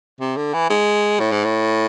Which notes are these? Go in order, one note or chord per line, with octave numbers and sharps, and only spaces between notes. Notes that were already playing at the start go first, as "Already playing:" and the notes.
C3
D3
E3
G#3
A2
G#2
A2